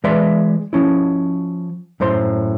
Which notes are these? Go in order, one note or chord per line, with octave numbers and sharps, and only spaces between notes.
E3 G#3 B4 D5 E5 C6
F3 C#4 E4
F#2 A2 C5 C6